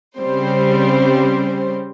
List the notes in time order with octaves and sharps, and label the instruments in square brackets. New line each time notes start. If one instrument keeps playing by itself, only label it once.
[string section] C#3 G3 C4 C5